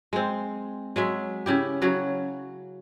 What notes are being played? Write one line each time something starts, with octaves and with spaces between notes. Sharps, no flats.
G#3 C4
F#3 G#3 E5
C#3 E4 G4
C#3 F#3 F#4